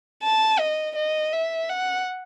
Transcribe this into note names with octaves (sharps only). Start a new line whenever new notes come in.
A5
D#5
D#5
E5
F#5